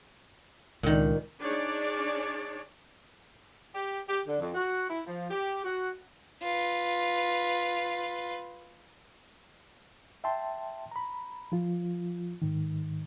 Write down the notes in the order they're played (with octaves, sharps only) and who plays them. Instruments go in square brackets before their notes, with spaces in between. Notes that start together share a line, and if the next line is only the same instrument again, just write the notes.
[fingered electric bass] C#2 [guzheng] A#2 D#3
[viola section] D4 D#4 G#4 C#5 D5
[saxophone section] G4
G4
D3
F2
F#4
E4
F3
G4
F#4
[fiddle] F4 B4
[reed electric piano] E5 G5 A5 C6
A#5 B5
F3 F4
G#2 D#3